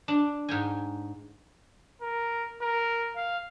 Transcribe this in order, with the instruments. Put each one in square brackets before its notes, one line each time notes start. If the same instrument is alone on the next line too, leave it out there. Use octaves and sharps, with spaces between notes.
[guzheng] D4
G#2 G5 G#5
[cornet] A#4
A#4
F5